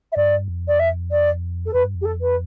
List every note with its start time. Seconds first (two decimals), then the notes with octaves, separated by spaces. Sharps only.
0.12 E5
0.16 G2 D5
0.48 F2
0.68 D5
0.79 E5
1.11 D5
1.66 A4
1.73 F2 B4
1.84 G2
1.95 F2
2.01 G4
2.05 A4
2.21 B4